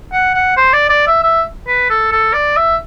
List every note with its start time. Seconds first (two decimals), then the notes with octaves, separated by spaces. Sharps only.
0.12 F#5
0.34 F#5
0.57 C5
0.73 D5
0.90 D5
1.07 E5
1.23 E5
1.68 B4
1.90 A4
2.12 A4
2.33 D5
2.57 E5